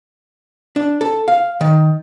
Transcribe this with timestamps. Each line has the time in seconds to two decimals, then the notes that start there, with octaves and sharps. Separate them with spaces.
0.76 D4
1.01 A4
1.28 F5
1.61 D#3